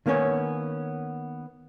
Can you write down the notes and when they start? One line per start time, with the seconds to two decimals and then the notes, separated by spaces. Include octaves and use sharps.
0.06 D#3 A#3 B3 C#4 C#5